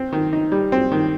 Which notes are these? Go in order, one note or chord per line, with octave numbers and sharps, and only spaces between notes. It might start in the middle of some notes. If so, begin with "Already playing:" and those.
Already playing: C4
D#3
D#4
G3
C4
D#3